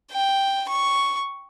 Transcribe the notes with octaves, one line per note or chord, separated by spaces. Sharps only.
G5
C#6